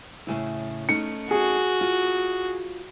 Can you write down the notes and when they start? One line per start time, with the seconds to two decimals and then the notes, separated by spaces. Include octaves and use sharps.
0.27 A2 C#3 E4
0.89 A3 C#4 D#4 C#7
1.31 F#4 G#4
1.81 F4